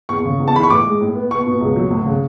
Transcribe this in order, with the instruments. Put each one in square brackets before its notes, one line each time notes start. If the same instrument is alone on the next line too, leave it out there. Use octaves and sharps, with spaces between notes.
[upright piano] E2 C#6
C#3
E2
A5
E3 B5
C#6
A2 D6
G#3
A2
B3
B3 C#6
B2
C#2
F#3
D2
C#3